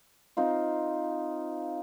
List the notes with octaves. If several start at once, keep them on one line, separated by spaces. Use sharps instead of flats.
C4 D#4 F4